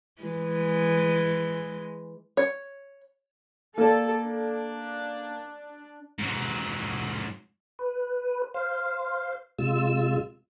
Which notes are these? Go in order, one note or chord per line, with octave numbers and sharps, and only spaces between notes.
E3 G#3
C#5
A#3 A4 D5
D4
G#2 F#3
B4
C5 F5
C3 G#3 F4 E6